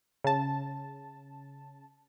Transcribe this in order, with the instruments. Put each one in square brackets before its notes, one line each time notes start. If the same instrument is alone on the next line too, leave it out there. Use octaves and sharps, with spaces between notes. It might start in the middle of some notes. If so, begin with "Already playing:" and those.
[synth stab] C#3 A5